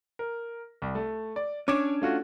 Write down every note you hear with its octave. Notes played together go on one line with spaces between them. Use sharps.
A#4
C2
A3
D5
C#4 D4 C#5 D6 G#6
A3 F4 F#4